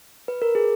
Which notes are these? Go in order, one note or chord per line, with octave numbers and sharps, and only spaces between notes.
B4
A#4
G#4